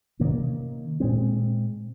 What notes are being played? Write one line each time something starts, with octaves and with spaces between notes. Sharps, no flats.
C3 D#3 A#3 C#4
A#2 G#3 C4